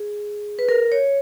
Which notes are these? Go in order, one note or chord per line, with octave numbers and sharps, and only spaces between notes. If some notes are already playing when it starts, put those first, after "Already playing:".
Already playing: G#4
B4
A#4
C#5